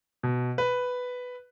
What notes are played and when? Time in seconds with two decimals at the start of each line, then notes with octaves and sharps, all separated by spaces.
0.23 B2
0.58 B4